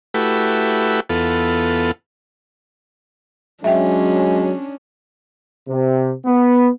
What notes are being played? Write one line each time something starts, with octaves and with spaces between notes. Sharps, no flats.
A3 E4 F#4 G4 B4
E2 B3 F4 A4
F#3 G#3 C#4 D4 E5 G5
C3
B3